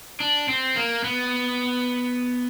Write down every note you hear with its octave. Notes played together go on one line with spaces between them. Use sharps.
D4
C4
A#3
B3